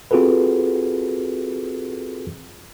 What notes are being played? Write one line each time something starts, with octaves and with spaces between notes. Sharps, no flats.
C4 F4 F#4 G#4 A4 B4